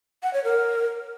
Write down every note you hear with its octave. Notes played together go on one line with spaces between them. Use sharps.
F#5
C#5
A#4